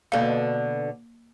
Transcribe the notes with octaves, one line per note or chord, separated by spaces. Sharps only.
B2 D3 A#3 F5